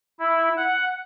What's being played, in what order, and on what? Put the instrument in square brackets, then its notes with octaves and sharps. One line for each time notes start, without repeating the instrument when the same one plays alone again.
[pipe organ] E4
F#5